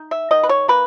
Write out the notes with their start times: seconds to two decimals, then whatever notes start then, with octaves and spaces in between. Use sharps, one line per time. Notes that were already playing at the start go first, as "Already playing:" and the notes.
Already playing: D#4
0.11 E5
0.31 D#3 D#5
0.43 B4
0.49 C#5
0.68 A#3 B4